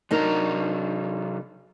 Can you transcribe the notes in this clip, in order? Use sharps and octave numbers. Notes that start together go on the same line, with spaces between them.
C3 F#3 D4 D#4 A#4 A#5